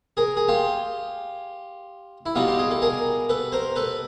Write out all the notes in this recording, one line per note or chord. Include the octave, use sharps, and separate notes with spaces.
G#4 A#4
G#4
F4 G4
E4
B2 G3 D#4 F4
G4
G#4
A4
G#4 A#4
A4 B4
A#4 C5
A4 B4